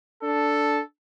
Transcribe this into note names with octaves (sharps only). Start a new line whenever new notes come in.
D4 A4